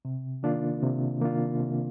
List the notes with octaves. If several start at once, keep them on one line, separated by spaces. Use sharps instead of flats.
C3
D#3 A#3 D4 F4
C3
D#3 A#3 D4 F4
C3